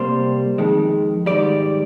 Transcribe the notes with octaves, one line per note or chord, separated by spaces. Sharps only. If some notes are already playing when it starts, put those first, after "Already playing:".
Already playing: C3 G3 A#3 C5
F2 D#3 G#3
G#2 D#3 G3 D5